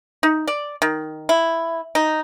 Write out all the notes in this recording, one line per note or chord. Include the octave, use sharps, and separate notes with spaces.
D#4
D5
D#3
E4
D#4